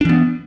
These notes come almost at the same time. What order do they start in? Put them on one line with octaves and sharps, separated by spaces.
D4 E3 B3